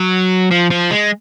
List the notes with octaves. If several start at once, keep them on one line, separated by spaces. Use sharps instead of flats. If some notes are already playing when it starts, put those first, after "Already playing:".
Already playing: F#3
F3
F3
G#3